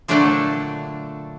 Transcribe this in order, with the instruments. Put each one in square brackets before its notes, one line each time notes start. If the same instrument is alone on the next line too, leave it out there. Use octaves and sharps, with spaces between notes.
[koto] A#2 D3 F#3 A3 D4 A4